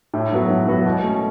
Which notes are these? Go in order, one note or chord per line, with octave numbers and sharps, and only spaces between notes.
A2
F#3 B3 F#4
A2
F#3 B3 F#4
B2
A3 C#4